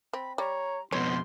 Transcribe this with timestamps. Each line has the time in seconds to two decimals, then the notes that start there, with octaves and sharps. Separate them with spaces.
0.13 C4 B5
0.38 G3 C#5 A#5
0.92 F2 B2 B4 C#5 C6